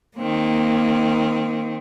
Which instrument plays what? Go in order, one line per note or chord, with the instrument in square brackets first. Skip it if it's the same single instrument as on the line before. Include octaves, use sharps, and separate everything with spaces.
[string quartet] D#3 C4 [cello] A#3